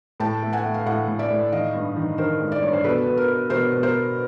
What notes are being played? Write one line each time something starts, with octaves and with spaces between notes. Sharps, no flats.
A2 G5 A5
A3
F#5 G#5
A3
F5
A2 E5 F#5
A2
D5 E5
A2
D#3 D#5 F5
G2
D#3
D#3 A#4 C5
G#3
D5
G2 C#5
C5
B2 A4 B4
B2
A#4
B3
B2 A#4 C5
B2
A#4 C5
B3